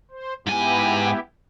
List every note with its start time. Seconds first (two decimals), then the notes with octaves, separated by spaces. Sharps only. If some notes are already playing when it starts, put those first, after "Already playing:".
0.11 C5
0.47 G#2 B3 E4 G4 G#5